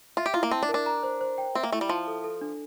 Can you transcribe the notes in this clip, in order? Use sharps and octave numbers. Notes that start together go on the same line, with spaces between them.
F4 E5
G4
E4 F4
A#3
C4 A5
D4
A#4
D4
A#5
C5
C5
G5
C4 E5
A#3
A3 E4
G3
F3 A5
A4
A4
D4